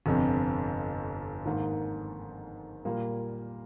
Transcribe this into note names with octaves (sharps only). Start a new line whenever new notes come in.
G1 F2 C3
G#2 D#3 A#3
A#2 G3 A#3